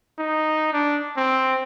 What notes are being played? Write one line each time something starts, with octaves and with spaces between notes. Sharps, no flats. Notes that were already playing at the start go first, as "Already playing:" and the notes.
D#4
D4
C4